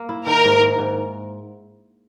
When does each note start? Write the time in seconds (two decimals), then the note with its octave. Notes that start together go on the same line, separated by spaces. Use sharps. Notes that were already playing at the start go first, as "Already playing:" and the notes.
Already playing: A#3
0.09 E4
0.27 D#3 A#4
0.44 G#2
0.61 G#2
0.78 G#2